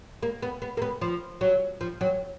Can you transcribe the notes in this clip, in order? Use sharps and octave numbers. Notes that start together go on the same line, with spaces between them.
A#3
B3
B3
A#3
B3
F3
F#3
F3
F#3